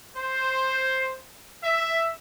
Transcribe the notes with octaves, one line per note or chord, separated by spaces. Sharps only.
C5
E5